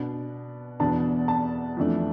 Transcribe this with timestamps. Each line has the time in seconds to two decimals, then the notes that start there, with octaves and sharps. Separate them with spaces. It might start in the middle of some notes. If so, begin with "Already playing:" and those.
Already playing: B2 B3 D4
0.80 E2 B2 B3 D4 A5
1.28 A5
1.77 F2 E3 A3 D4